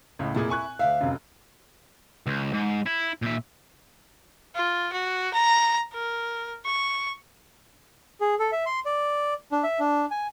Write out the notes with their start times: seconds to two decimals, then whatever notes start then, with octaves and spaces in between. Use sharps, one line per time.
0.19 C#2 A2
0.35 F1 A#2 E4 G#4
0.50 G#5 C#6 F#6
0.79 D2 A#2 E5 F5
1.00 F1 F#2
2.27 C#2
2.53 G#2
2.86 E4
3.22 A#2 E5
4.55 F4
4.92 F#4
5.33 A#5
5.93 A#4
6.65 C#6
8.21 G#4
8.39 A4
8.52 E5
8.66 C6
8.86 D5
9.52 D4
9.63 E5
9.79 D4
10.11 G#5